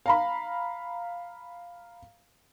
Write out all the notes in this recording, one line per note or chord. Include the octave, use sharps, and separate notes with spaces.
F5 A#5 B5